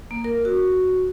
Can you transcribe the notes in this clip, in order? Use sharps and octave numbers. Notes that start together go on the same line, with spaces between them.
A#3
A#4
F#4